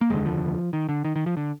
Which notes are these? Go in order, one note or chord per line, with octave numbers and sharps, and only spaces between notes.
A#3
F1 D#2 D3 G#3
F3
D#3
D3
D#3
D#3
F3
D3